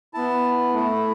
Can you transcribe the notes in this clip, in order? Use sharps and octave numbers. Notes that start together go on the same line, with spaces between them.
B3 E4 A5
A3 E4